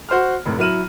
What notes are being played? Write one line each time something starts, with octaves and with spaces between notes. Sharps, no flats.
F#4 C5 C6 F6
F1 A2
F#3 E4 F6 D#7 E7 F#7